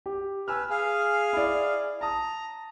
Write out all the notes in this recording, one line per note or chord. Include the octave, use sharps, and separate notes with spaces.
G4
B4 G#5 E6 F6
G#4 F5
E4 D5
A5 A#5 D#6